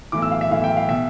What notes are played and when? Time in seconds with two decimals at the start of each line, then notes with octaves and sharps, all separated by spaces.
0.12 B1 A2 E3 D6
0.22 E6
0.31 F5
0.41 E5
0.51 B1 A2 E3 F5
0.64 G5
0.77 F5
0.89 B2 E5